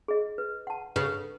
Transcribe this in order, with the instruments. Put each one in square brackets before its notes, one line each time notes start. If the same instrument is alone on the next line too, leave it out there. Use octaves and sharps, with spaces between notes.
[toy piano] G#4 D#5
B4
F#5 A5
[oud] C#3 [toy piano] B4